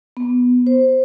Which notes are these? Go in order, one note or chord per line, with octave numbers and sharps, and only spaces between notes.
B3
C5